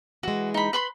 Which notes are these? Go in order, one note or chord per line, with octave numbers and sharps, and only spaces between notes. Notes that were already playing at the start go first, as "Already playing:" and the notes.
E3 G#3 F#4
D#4 B5
B4 B5 C6